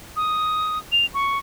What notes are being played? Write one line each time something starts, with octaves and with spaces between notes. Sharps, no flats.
D#6
F7
C#6